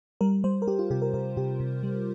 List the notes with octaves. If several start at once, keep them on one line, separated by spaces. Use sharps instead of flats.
G3 A#4
G3 C5
A#4
G3 G4
F4
C3 G4
A#4
C3 A#4
C3 G4
C3
G3